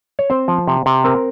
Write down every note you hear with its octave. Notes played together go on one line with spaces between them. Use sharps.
C#5
C4 C5
F3
C3
C3
C4 A#4